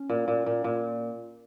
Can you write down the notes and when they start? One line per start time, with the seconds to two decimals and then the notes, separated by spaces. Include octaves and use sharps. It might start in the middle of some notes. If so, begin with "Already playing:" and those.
Already playing: C#4
0.10 A#2
0.28 A#2
0.46 A#2
0.64 A#2